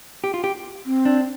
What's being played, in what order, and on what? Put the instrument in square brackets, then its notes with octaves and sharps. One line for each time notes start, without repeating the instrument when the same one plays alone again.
[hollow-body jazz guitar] G4
F4
G4
[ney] C4
[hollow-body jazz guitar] D4